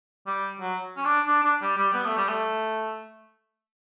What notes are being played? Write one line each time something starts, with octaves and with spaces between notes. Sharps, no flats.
G3
F#3
C#4
D4
D4
D4
G3
G3
B3
A3
G3
A3